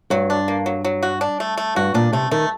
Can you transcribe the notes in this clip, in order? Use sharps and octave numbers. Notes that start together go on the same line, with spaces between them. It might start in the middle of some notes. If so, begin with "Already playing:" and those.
G2 F#3
D4
A#3
F#3
F#3
F#4
D4
A3
A3
G2 F#4
A#2 D4
C3 A3
D#3 A3